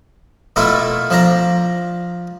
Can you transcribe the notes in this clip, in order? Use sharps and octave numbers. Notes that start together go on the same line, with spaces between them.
B2 A3 A#3 E4 F4
F3 D4 A#5